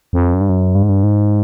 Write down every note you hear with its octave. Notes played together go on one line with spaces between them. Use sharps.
F2
F#2
G2
F#2
G2
G#2
G2
G#2